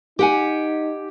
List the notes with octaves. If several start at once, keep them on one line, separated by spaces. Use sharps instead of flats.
D#4 G4 F#5 G#5